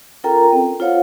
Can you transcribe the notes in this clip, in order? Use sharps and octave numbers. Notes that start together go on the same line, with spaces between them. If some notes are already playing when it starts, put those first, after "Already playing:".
C#4 F4 A4 A#4 G5 A#5
C4
F4 A4 C5 C#5 F5 F#5